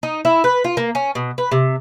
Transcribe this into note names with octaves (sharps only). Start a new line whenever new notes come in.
D#4
E4
B4
F4
A#3
C#4
B2
B4
C3